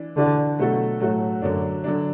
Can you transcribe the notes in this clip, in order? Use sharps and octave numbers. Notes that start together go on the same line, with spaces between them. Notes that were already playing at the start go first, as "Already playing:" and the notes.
Already playing: E3 D4
D3 E3 D4 F#4
B2 F#3 A3 F#4 A4
A2 F#3 A3 F#4 A4
F#2 D3 F#3 D4
D3 F#3 D4